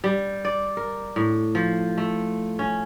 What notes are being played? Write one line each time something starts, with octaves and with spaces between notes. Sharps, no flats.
G3
D5
A#4
A2
F3
A3
C#4